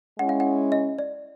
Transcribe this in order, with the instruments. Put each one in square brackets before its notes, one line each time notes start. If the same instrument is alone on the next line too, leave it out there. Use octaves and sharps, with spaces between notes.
[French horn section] G#3 C#4 E4 [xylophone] F#5
[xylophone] F5
F#5
D#5
D5